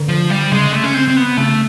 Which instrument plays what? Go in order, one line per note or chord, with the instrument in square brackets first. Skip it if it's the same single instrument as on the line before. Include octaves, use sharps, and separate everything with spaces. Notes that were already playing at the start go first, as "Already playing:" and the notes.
Already playing: [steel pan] D3
[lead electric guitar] F3
G3
[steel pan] C#3 [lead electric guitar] G#3
[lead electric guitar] A3
C#4
C4
C4
B3
[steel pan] C#3 [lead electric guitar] A3